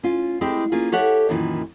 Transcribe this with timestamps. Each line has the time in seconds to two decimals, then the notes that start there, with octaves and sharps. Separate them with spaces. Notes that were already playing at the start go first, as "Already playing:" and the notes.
0.03 C#4 F4
0.41 G#3 C4 E4 G4
0.72 A#3 C#4 F4 G#4
0.92 G4 A4 C#5 E5 F#5
1.29 F#2 A#2 D#3 E3